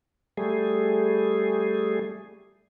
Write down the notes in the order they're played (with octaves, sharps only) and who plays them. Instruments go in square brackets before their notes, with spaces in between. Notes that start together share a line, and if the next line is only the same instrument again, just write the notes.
[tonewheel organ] G3 A3 G#4